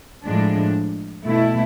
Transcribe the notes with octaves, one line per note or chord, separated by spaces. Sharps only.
A2 F3 G#3 D4
B2 A3 E4